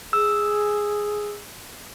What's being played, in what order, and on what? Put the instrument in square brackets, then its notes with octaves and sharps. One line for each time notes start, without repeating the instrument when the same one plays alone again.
[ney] G#4 [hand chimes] E6